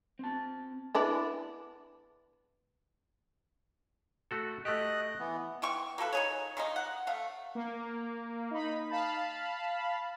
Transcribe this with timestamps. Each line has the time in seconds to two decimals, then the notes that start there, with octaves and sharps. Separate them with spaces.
0.19 C4 A5
0.95 B3 D4 E4
4.31 A3 F#4 A4
4.65 A3 G4 D#5 F#6
5.19 E3 B3
5.62 E3 G5 C#6
5.98 A#3 F#4 A4 B4
6.13 D#4 G#4 C#5
6.57 D#3 G#3 A#3 D#4
6.76 F#5
7.07 A3 F5
7.55 A#3
8.51 D#4 B5
8.90 F5 A5 B5